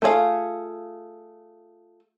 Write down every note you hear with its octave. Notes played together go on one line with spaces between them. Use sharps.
A3 F4 G#4 D5 F5